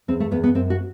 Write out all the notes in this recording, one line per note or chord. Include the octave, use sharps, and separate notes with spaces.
E2 C4
A3
E2 B3
B3
F#2 C4
F#4